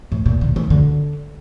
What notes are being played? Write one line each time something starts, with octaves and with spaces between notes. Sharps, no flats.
A2
A#2
D3
D#3
D3